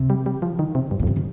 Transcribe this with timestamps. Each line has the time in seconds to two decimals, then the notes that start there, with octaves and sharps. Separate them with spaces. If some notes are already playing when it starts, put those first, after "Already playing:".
Already playing: C3
0.10 G3
0.26 G3
0.42 F3
0.59 D#3
0.75 C3
0.91 G2
0.99 A#2
1.03 F2
1.07 G2 C3
1.16 D#3